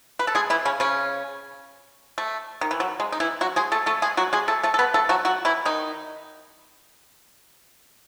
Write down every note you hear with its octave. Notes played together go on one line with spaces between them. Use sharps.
B4
A4
G#3 G#4
E3 E4
C#3 C#4
C#3 C#4
A3
D#3
E3
F#3
G#3
D#4
E3 E4
F#3 F#4
G#3 G#4
A3 A4
A3 A4
G#3 G#4
F#3 F#4
G#3 G#4
A3 A4
A3 A4
A4
B3 B4
A3 A4
F#3 F#4
F#3 F#4
E3 E4
D#3 D#4